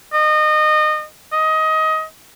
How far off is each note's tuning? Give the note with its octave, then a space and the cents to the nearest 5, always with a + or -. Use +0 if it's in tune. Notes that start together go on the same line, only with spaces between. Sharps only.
D#5 -25
D#5 +20